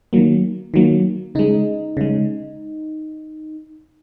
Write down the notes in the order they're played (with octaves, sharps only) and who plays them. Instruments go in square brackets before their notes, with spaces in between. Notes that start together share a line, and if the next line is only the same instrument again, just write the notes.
[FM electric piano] D#3 F#3 A#3
D#3 F#3 A#3
C#3 G#3 D#4
C#3 G#3